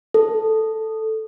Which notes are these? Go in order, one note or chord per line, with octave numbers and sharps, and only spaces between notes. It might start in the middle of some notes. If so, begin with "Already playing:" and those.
A4